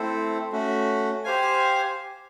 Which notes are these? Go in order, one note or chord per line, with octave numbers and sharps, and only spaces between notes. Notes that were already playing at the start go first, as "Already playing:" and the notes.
Already playing: A3 C4 E4 A4 C5
A3 C#4 F#4
G4 C5 F5 G#5